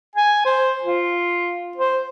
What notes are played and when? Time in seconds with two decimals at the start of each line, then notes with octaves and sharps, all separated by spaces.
0.16 G#5
0.45 C5
0.83 F4
1.77 C5